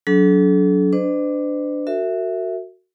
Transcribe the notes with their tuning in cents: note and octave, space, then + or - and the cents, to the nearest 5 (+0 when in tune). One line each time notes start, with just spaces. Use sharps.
F#3 +0 D4 -35 A4 -40
D4 +0 C5 -45 D#5 -45
F#4 +0 A#4 -40 E5 +0